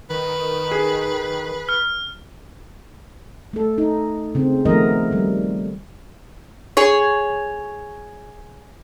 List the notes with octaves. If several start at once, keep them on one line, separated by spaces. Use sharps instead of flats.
D#3 B4
G#4
F6
A3 A4
D#4
C#3 C4
D#3 F3 A3 B3 A#4 D#5
D#3 G3
G#4 C#5